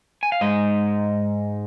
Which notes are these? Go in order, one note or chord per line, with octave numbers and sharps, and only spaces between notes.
G#5
F5
G#2 G#3 D#4 D#5